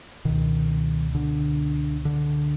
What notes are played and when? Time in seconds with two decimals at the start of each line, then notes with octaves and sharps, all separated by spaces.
0.25 C#2 B2 D#3
1.15 D3
2.05 D3